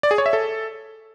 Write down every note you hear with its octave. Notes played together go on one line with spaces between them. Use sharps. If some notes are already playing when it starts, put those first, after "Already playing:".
D5
G#4
C#5
E5
A4